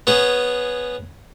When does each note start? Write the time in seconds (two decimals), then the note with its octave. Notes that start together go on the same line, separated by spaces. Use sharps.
0.07 B3 C#4 G#4